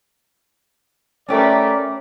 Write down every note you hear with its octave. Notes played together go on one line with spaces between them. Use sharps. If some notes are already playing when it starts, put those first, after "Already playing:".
A3 C#4 G4 A#4 B4 D5